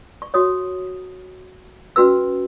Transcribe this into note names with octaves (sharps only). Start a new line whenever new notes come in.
C#6
F#4 C#5 D#6
C#4 F#4 B4 E6